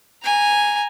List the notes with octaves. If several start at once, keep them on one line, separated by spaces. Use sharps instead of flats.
G#5 A#5